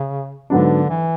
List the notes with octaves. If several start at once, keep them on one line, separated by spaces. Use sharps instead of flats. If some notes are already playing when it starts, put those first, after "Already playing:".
Already playing: C#3
G#2 D3 F#3 B3 D4
E3